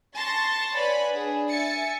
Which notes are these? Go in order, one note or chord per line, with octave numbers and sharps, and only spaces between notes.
A5 C6 C#6 A6 A#6
B4 C#5 D5 F#5 G#5 B5
D4 G#4
E5 G#5 A6 C#7